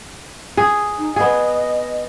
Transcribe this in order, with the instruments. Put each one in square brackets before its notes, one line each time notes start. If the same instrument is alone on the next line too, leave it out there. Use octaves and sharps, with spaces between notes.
[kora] G#4
[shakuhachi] D#4
[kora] B3 G#4 [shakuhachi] D#5